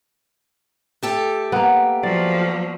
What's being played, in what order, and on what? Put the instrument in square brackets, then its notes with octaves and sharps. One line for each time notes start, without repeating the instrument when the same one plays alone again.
[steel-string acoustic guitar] A3 G4 A4
[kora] A#3 B3
[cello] F3 F#3 [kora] D5